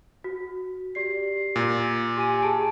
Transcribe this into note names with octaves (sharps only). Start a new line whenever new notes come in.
F#4
G4 D5 C7
A#2
G4 G#5 D#7
G#4 A5 D7